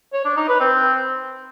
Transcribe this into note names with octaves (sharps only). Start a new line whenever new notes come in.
C#5
D4
D#4
B4
C4